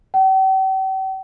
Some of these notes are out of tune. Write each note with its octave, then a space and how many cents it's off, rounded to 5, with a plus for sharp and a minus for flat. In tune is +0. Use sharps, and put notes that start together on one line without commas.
G5 -45